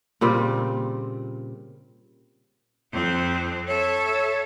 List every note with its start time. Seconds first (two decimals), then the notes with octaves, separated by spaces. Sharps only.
0.21 A#2 C#3 G3 C4
2.92 F2 C4
3.68 A4 C#5 E5